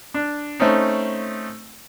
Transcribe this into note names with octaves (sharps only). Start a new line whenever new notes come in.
D4
A3 C4 C#4 D#4